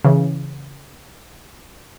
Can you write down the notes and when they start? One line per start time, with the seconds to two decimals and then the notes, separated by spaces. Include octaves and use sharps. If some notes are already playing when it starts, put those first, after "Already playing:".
0.05 C#3 E3